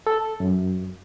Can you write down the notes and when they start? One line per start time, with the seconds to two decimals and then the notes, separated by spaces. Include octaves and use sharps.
0.07 A4
0.40 F#2